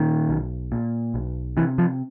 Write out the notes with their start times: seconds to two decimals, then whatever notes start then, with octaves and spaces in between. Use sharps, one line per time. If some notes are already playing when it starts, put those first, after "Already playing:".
Already playing: A#2 D#3
0.29 B1
0.72 A#2
1.14 B1
1.57 C3 E3
1.78 F3